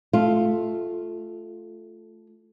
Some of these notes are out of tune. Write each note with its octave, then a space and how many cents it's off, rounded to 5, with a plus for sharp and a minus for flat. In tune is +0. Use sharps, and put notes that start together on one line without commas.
A3 -10 F4 +0